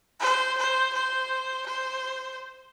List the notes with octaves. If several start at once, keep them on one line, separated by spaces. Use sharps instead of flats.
C5
C5
C5
C5